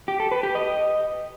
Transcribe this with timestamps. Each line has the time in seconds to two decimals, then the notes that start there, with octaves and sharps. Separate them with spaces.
0.08 G4
0.20 A4
0.31 B4
0.43 G4
0.55 D#5